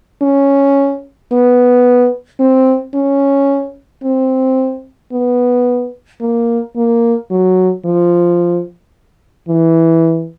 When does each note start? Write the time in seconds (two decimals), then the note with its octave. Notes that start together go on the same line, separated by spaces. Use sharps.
0.22 C#4
1.32 B3
2.40 C4
2.94 C#4
4.04 C4
5.12 B3
6.21 A#3
6.76 A#3
7.30 F#3
7.85 F3
9.48 E3